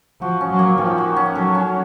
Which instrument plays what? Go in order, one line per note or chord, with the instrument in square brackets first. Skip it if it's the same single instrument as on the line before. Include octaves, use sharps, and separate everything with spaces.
[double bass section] F3 [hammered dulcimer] F#4
[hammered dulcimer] C#4
[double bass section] F#3
[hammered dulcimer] A#3
[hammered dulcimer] D#3 [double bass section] F3
[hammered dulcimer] F#4
C#4
[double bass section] F#3 [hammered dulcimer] A4
[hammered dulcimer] C#4